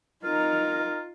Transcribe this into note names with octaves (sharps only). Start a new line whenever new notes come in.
D#4 F4 A#4